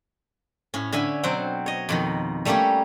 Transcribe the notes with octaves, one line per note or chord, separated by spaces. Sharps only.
A2 C#4
D3 C#4 E5 G#5 B5
B2 F#3 C4 C5 F#5 G5
C#5 D#5
F2 B2 D#3
G3 A3 A#3 C#4 G4 C#5